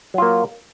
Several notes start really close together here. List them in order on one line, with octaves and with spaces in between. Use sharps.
F#3 F4 A#3